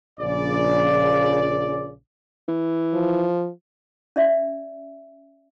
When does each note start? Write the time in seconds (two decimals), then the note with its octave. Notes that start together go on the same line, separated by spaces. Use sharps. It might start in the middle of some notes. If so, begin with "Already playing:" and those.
0.20 A#1 C#3 D5
2.48 E3
2.94 F3
4.16 C#4 D5 E5